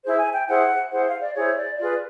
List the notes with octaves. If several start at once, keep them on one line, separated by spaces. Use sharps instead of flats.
E4 G#4 C5
G#5
G5
E4 G#4 C5 F#5
E4 G#4 C5 F#5
F5
D5
E4 G#4 C5 C#5
D5
F4 G#4 B4 D5